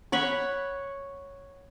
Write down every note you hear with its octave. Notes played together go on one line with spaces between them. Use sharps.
C#5 F#5 B5 C#6